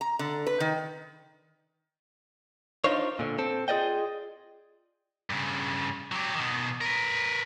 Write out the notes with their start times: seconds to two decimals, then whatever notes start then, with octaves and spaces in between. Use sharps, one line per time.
0.01 A#5
0.19 D3
0.47 B4
0.60 D#3
2.84 D4 D#4 F4 C5 C#5
3.19 A#2 D3
3.38 C4 A4
3.68 F4 G#4 B4 D5 D#5 G5
5.30 G2 C#3
6.12 F#3 G4
6.36 B2 D#3
6.81 A#4 B4